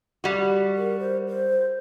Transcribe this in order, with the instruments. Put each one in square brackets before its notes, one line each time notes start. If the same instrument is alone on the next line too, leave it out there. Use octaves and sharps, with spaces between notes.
[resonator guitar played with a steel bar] G3 F#4
[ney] A#4
C5
C5